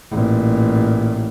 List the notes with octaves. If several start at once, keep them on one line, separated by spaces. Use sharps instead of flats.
A1 A#2